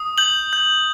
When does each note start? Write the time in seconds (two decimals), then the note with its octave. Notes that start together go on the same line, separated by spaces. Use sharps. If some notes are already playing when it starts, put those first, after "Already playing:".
Already playing: D#6
0.18 G6 F#7
0.53 G6